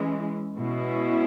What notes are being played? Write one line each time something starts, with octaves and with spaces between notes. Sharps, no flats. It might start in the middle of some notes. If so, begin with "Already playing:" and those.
Already playing: E3 G#3 C#4 E4
B2 G#3 C#4 E4